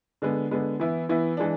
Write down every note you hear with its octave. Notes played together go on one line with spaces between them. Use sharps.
D3 G#3 B3
D3 G#3 B3
E3 B3 E4
E3 B3 E4
E3 G#3 D4